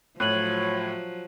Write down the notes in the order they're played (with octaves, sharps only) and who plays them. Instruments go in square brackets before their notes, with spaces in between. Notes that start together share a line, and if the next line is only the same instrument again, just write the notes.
[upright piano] A2 [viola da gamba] F3 F#3 [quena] C#5 [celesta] F#6 D#7 F#7